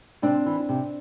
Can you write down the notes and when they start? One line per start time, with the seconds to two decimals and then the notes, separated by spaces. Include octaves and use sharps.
0.22 C3 C4 D4
0.46 E3
0.69 C3